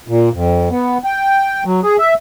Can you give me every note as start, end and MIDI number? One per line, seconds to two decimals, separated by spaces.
0.08 0.29 46
0.34 0.69 41
0.70 0.98 59
1.04 1.64 79
1.65 1.80 54
1.83 1.97 68
1.99 2.14 76